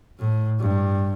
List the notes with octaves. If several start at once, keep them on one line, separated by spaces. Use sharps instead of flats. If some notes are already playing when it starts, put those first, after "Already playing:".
A2
G2